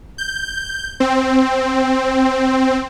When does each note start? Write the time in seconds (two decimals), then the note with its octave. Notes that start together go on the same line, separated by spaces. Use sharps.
0.18 G6
1.00 C4